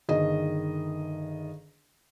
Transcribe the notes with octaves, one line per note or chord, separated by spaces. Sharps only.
G1 D#3 G#4 D#5